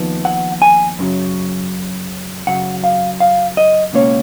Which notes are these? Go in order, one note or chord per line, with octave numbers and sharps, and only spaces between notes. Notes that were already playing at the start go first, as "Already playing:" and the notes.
Already playing: D#2 F3 B3 D#4
F#5
G#5
F#2 C#3 F#3
F#2 C#3 F#3 F#5
F5
F5
D#5
C#2 B2 A#3 C#4 C#5